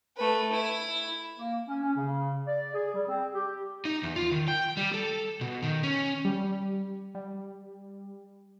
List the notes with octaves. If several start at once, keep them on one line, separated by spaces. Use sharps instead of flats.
A3 B4
E4
A#3
C#4
C#4
C#3
D5
G#4
G3
C4
G4
D#4
E2
F4
D#3
G5
G3
A4
B2
D#3
C#4
G3
G3